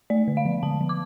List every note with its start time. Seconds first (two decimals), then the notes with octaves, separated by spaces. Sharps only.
0.10 A3 D5
0.28 D3
0.37 F5
0.46 F3
0.63 D3 A5
0.81 F3
0.89 D6